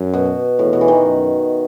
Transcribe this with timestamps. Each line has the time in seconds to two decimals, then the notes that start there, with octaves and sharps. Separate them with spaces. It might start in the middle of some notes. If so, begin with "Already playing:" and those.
Already playing: F#2
0.14 B2
0.59 E2 A2
0.73 B2
0.81 E3
0.88 D#3
1.03 F#2